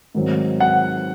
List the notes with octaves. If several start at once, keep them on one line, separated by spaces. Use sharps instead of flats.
G#2 D#3 F#3 C4
F#5